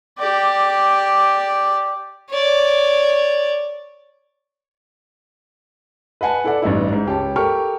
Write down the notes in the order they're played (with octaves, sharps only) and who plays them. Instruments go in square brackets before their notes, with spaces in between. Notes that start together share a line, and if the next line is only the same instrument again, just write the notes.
[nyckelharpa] G4 D5
[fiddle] C#5 D5
[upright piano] B4 D#5 F#5 G#5 A5
E4 A4 B4 D5 F#5
A1 G2 D#4 E4
G#2
C#2 G4 C#5 A5
G4 A4 A#4 C#6 F6